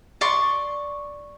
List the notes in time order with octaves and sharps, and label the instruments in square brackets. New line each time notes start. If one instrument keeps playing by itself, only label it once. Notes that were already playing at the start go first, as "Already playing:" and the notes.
[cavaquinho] D5 C6 C#6